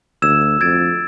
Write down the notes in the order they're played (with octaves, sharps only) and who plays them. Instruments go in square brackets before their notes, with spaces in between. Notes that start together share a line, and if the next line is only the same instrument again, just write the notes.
[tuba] D2 [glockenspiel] E6 G#6 E7
[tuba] F2 [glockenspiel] G#6 A6 D7